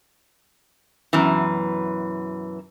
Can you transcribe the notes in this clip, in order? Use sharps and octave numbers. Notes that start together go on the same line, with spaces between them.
F#2 B2 E3